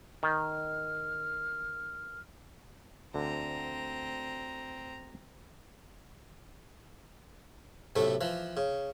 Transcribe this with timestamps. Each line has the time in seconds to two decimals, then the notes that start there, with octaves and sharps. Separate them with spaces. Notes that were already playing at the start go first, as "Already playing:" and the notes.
0.23 D#3 F6
3.14 D2 D3 C4 A#5
7.96 B1 A2 C3 A3
8.21 E3 F3
8.57 C#3